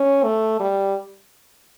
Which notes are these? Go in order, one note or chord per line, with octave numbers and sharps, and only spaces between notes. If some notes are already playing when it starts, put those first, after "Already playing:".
Already playing: C#4
A3
G3